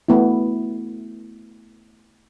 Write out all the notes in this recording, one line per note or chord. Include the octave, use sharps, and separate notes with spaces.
A3 B3 E4